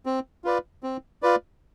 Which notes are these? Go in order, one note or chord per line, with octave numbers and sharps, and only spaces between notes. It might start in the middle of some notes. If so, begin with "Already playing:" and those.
C4
F4 B4 D5
C4
F4 B4 D5